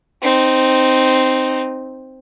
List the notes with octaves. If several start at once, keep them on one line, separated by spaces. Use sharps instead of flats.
C4 D#4